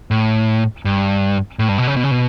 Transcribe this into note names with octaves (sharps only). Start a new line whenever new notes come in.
A2
G2
A2
G2
B2
C#3
B2
C#3
B2